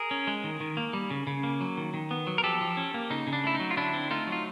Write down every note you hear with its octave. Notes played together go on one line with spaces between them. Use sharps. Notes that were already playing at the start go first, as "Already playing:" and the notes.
Already playing: G#4 A#4
C#4
G#3
D#3
D#3
A#3
G3
C#3
C#3
A#3
F#3
D#3
D#3
B3
F#3
A#4
F3 G4 A4
F3
C#4
A#3
C#3 D#4
C#3
D4
A3 E4
D#4
F#3
F4
D3 D4 E4
C4
A3 D#4 F4
F#3
F4